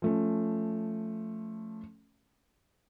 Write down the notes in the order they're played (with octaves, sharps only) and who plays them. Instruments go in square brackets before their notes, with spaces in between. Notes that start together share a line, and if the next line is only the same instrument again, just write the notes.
[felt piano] F3 A3 C#4